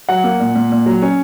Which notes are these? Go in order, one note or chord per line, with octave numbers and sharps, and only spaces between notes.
F#3 F#5
A#3
A#2
A#2
A#2
F#3
C#4